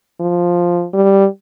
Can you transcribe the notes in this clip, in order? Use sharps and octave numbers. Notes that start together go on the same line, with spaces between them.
F3
G3